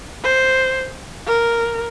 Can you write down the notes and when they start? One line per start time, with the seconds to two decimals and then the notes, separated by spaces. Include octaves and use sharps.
0.24 C5
1.27 A#4